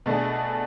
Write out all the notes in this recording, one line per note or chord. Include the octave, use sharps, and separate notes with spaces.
B2 A3 D4 G#4